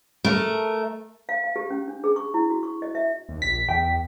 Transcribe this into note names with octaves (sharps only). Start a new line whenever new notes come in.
A3 A#4
F5
F5
G4
C#4
D4
G#4
C#6
E4
F#4
C#6
D#5
E5
D#2
A#1 B6
E2 G5